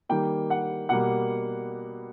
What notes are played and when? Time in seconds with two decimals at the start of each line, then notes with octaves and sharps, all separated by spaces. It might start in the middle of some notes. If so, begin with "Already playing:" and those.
0.09 D#3 G3 A#3 G5
0.50 F#5
0.89 B2 G3 A#3 F#5